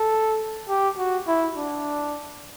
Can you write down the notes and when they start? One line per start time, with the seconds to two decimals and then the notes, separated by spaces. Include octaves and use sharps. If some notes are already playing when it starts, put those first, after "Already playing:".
Already playing: A4
0.69 G4
0.98 F#4
1.27 E4
1.56 D4